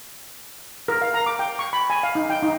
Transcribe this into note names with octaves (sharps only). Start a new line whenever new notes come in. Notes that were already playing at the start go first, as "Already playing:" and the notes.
A#4
F5
A#5
D6
G5
C#6
B5
G#5
F5
D#4
G5
D#4